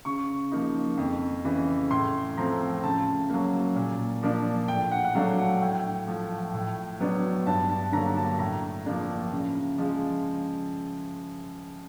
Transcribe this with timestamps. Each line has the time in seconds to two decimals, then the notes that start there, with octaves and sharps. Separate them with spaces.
0.05 C#3 C#6
0.52 F3 A#3 D#4
0.98 F2
1.45 C#3 E3
1.91 A2 C6
2.37 F3 A3 C4 A#5
2.83 C#3 A5
3.30 F#3 A#3
3.76 A#2
4.23 F3 A#3 D4
4.68 A2 G5
4.91 F#5
5.05 F#5
5.15 F#3 A3 D4 F5
5.39 F#5
5.61 A2 G5
6.08 F3 A3
6.54 A2
7.00 F#3 B3 D4
7.47 G2 A5
7.69 A5
7.92 D3 F#3 A#3 A#5
8.16 A5
8.39 A2 A#5
8.86 F3 A#3 D4
9.32 C#3
9.78 F3 G#3